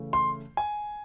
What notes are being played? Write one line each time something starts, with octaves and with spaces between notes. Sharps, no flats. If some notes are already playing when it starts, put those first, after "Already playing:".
Already playing: C#3 E3 A3
C6
G#5